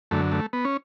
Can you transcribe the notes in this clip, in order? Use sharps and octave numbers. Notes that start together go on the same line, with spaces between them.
F#2 D3 A3
A3
B3
C#4